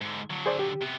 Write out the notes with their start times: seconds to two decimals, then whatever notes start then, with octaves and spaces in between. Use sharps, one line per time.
0.01 G#2 D3
0.31 D3 F#3
0.46 G#4 C5 D5
0.59 G4
0.82 C3 B3